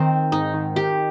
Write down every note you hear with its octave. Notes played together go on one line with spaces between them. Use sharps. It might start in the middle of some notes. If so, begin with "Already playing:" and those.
Already playing: D#3 C4
D#3
G#2 D#4
D#3
D#3 G4